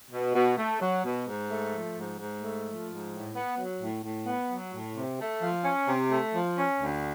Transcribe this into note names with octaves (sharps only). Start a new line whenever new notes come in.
B2
B2
A3
F#3
B2
G#2
A3
F3
G#2
G#2
A3
F3
G#2
A2
B3
F#3
A2
A2
B3
F#3
A2
C3
A3
F3
C#4
C3
A3
F3
C#4
D2